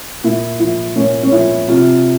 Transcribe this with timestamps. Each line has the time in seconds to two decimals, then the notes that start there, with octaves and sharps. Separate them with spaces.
0.24 A#2 E4
0.60 F3 E4
0.96 A#2 C#4
1.23 C#4
1.32 F3 E4
1.68 C3 F4